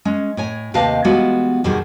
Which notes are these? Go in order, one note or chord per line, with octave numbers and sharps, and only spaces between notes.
G#3 C#4
A2 C#5 G#5
D#2 C3 B4 D#5 F5 A5
E3 G3 G#3 B3 F4 F#4
E2 B2 D#3 G3 G#4